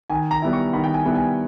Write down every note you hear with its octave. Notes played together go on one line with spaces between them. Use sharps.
D#3 G#5
A#5
G3 B3 E4
C#6
D#3 B5
G5
G#5
G3 B3 E4
G#5